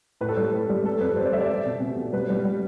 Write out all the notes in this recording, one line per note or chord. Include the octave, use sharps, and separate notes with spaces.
A2 B4
A4
G3 B4
A2
G3
G3 A4
F2 B4
G3 C5
D5
G3 E5
D5
G3
B2
B2
B2
G3 B4
G3
G3